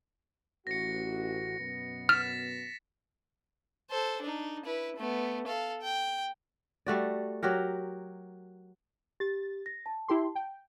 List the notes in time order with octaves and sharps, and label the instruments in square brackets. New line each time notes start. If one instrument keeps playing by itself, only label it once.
[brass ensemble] A1 F#4 [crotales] A#6 C#7
[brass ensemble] F#2 B2 B3
[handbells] F6 [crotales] A6 B6 E7
[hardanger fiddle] A4 C5
D4 D#4
E4 B4
A3 B3
A4 F5
G5
[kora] G3 A3 F#4 D5
F#3 F#4 G4 A#4
[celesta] G4 [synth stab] A6
[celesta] A#6
A5
[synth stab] E4 G4 C6
G5